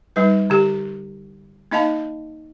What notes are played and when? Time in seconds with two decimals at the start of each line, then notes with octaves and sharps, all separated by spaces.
0.16 G3 D#4 B4
0.50 D3 G4
1.71 A#3 D#4 D#5 F5 A5